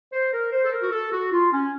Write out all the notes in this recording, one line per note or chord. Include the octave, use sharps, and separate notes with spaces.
C5
A#4
C5
A4
A#4
F#4
A4
F#4
F4
C#4